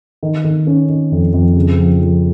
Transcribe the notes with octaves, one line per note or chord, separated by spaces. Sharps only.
D#3
D#3
C#4
D#3
F2
F2
C#3
F3
F3